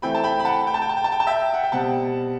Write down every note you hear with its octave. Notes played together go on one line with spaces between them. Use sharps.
E3 A3 C4 G5 B5
A5
G5 B5
B5
F#5 A5
G5
A5
G5
A5
G5
A5
G5
A5
E5 G5
F#5
G5
B2 G3 C4 F#5 A5